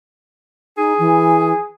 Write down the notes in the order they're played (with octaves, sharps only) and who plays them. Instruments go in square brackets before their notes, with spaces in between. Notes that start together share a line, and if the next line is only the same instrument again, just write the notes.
[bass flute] D#4 [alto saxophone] G#4
[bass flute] E3